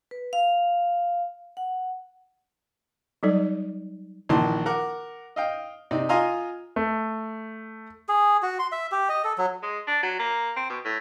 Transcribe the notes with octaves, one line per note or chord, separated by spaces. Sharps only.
B4
F5
F#5
F#3 G3 D#4 A4 D5
A#1 D#3 E3 A#3 A5 C6
A#4 F#5 D6
D#5 F5 G5
C3 C4 D#4 D5
F4 D#5 F5 G#5 A#5 C6
A3
G#4
F#4
C6
E5
G4
D#5
A4
F#3
G#3
D4
F#3
A#3
C4
B2
A2